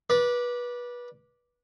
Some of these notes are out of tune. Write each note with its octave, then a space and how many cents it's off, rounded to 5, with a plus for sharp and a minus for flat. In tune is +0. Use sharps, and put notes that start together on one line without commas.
B4 -25 D5 +0